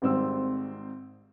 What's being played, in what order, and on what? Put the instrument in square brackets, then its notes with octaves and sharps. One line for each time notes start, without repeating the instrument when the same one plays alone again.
[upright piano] G#1 G#2 G3 C4 C5 E6